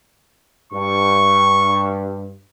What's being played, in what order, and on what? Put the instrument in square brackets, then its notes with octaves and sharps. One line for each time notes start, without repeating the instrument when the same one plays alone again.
[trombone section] G2 [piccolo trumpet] C#6